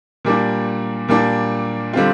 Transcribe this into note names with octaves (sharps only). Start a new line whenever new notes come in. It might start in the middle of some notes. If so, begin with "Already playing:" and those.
A#2 G3 A#3 D4
A#2 G3 A#3 D4
D3 G3 C4 F4